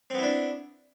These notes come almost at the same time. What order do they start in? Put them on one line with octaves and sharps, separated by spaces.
C4 B3 E4 D4